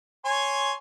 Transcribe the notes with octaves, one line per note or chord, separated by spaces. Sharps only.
C#5 G#5 C6